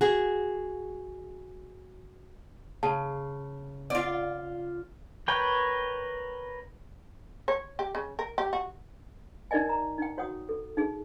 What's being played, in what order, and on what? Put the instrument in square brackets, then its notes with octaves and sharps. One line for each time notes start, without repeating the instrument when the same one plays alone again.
[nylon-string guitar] F#4 G#4
[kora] C#3 [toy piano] A5
[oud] F4 D5
[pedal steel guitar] A#4 B4 C#5 G5
[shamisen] C#5
G4
C#3
A#4
G4
F#4
[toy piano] D#4 A#4 D5 D#5 G#5
A#5
D#4 G5
F#4 C#5 F#5 G5 D#6
A4
D#4 G#4